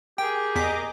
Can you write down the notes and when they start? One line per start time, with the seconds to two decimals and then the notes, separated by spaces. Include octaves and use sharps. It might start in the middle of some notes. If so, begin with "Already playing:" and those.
0.18 G4 G#4 A#4 G5
0.55 E2 D#5 A#5 D6 B6